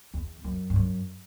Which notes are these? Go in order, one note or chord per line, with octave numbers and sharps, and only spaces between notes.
E2
F#2
G2
F#2